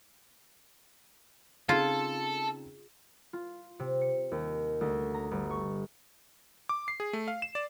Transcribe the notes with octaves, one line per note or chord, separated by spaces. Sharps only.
C#3 C4 D#4 F4 G#4 A4
F4
C3
C#7
D#2
D2
A#5
G1
C#6
D6
C7
G#4
A3
F5
E7
D5